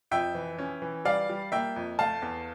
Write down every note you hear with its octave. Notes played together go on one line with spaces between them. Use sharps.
F2 E5 G5
E3
C#4
E3
G3 D5 F5
G3
A#3 E5 G5
F2
A3 F5 A5
E2